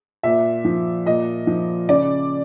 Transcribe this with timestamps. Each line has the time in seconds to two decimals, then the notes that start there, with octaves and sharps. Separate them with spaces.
0.23 A#2 E5
0.65 F3
1.06 A#2 D#5
1.47 F3
1.88 C#3 D5